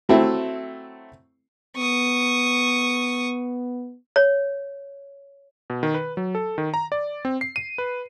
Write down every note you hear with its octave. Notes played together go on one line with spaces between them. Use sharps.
F#3 A3 C4 E4
B3 C#6 D#6
C#5
B2
D#3
B4
F#3
A4
D#3
A#5
D5
C4
C7
D#7
B4